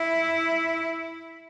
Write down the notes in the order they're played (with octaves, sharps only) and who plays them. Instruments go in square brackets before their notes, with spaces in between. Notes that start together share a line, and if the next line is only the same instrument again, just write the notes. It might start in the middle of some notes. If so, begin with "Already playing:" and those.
Already playing: [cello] E4